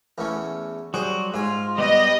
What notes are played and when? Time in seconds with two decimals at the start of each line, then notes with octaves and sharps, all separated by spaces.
0.18 E2 A3 C#4
0.94 F#3 G3 F#4 G#4 C5
1.34 G#2 F4 G#5
1.78 G3 B3 G4 D#5